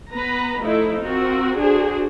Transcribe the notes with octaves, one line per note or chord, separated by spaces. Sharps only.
B3 B4 A#5
F3 A3 D#4 E4
C4 F4 F#4 A#4
D4 F#4 G#4 A4 C5